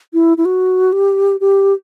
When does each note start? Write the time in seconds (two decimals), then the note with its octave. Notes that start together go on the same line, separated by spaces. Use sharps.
0.14 E4
0.38 E4
0.45 F#4
0.93 G4
1.41 G4